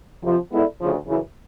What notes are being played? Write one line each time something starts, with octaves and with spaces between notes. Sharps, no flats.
F2 C3 F3
G#3 B3 E4 A4 D5
D2 C#3 F3
F#2 C#3 E3